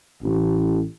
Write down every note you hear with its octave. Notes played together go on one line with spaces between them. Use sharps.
A1